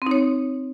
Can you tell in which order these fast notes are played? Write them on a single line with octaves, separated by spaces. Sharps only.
C4 D#4 C#5